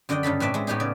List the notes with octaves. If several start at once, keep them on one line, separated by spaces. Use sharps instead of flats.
F#2 D3 D5 D#5 G5
G2 C#3 A4 B5
A2 C4 B4 D5 E5 A5
G#3 E4
A2 B3 D#4 G4 G#4
C#3 D5